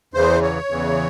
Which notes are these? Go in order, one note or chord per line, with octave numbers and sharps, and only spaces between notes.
E2 C#3 E3 C5
C#5
E2 C#3 E3